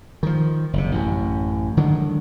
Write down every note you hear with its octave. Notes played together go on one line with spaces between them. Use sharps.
D#3 F3
F#1 C3
A1 F#2
D3 D#3 F#3 G#3